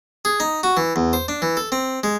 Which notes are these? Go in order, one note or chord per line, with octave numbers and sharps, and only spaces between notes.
G#4
D#4
F#4
E3
E2
C5
D4
E3
A4
C4
G#3